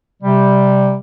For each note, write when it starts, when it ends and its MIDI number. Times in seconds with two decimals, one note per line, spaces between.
0.22 0.95 48
0.22 0.95 55